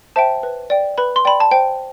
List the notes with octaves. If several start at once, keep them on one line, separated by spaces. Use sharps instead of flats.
C5 E5 G5 A5
B4
D5 G5
B4 B5
C6
D5 G5 B5
A5
C5 G5